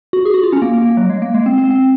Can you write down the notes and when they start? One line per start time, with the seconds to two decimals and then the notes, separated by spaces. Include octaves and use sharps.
0.13 F#4
0.25 G#4
0.34 F#4
0.43 F4
0.53 C#4
0.62 A#3
0.74 A#3
0.85 A#3
0.97 F#3
1.10 G#3
1.22 A#3
1.34 G#3
1.46 C4
1.58 C4
1.71 C4